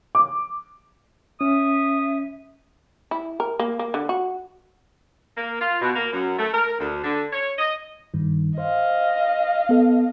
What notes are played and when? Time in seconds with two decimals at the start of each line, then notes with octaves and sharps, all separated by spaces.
0.15 D6
1.41 C#4 E5 D#6
3.11 E4
3.40 A#4
3.59 A#3
3.79 A#3
3.94 D3
4.09 F#4
5.37 A#3
5.61 F4
5.81 B2
5.96 A#3
6.13 F#2
6.39 A3
6.54 A#4
6.79 D2
7.03 D3
7.32 C#5
7.58 D#5
8.14 G2 D#3
8.58 C5 D#5 F5
9.69 B3 A4